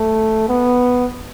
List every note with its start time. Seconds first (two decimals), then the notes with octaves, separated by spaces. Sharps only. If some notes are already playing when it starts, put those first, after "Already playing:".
Already playing: A3
0.49 B3